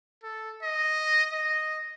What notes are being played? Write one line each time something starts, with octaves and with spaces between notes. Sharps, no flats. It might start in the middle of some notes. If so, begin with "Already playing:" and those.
A4
D#5
D#5